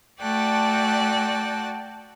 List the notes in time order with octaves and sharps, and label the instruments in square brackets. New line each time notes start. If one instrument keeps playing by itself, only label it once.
[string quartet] A3 F#4 D5 G5 A5 F#6